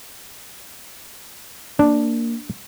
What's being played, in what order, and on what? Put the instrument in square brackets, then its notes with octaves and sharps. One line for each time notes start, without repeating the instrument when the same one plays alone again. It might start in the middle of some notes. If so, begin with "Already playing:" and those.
[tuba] A#3 [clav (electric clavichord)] D4